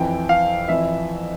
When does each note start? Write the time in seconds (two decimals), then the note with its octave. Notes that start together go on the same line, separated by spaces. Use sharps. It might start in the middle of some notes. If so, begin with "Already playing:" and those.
Already playing: F2 E3 G5
0.29 F5
0.68 F2 E3 E5